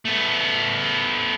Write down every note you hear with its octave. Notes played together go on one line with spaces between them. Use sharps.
A3 B3